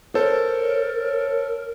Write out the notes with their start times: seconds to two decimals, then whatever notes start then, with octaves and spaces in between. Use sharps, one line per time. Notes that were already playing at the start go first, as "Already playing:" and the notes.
0.15 A4 A#4 C5 C#5